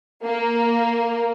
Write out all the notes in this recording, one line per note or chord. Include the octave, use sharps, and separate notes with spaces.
A#3